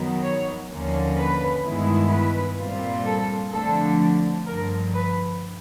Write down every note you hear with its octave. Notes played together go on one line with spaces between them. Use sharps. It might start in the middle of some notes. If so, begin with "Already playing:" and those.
Already playing: F#2 D#3 F#3 B3
C#5
D#2 D3 F3 A#3 C#4
B4
G2 D#3 G#3 B3 E4
B4
A#2 G3 C4 F4
A4
F2 D3 F3 A3 D4 A4
G2 D3 F3 A#4
B4